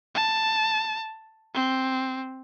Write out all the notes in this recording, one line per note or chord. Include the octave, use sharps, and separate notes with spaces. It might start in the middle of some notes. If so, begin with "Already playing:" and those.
A5
C4